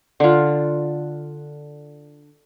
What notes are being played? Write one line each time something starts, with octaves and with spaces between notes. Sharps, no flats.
D3 F4